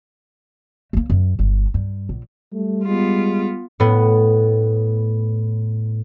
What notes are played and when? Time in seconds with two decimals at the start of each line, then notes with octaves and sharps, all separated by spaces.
0.93 A3 A#3
1.10 F#2
1.39 G1
1.74 G2
2.09 A#1
2.53 G3 A3
2.86 G#3 B3 F4
3.80 A2 B3